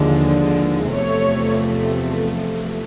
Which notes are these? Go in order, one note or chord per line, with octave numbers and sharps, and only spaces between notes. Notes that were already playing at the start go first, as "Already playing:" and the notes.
Already playing: D#2 D3 F3 G#3
E2 C3 F3 A3 C#5